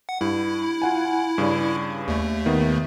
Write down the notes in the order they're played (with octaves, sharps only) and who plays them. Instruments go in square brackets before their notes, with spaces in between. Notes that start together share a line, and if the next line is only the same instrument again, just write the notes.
[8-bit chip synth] F#5
[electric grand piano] G2 [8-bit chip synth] E4
[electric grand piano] F4 F#5 G#5
G2 C#3 D5
[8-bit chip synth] D#2 A3
[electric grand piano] D#3 B3